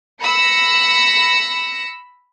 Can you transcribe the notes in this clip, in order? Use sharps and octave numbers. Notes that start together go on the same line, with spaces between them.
B5 E6 A#6 C#7